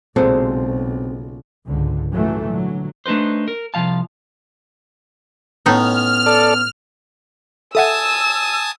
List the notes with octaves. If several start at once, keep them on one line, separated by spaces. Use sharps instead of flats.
B1 A#2 C#3 G#3 C4 F#4 A4 C5
C#2 G#2 D3
A#2 C#3 E3 F#3 A3
D3 F#3
A3 D4 D#4 B4 C5
A#4
C2 F3 F5 A5
A2 B3 C#4 D#4 F6
A4 D5
A4 E5 F#5 G#5 A5 D#6 E6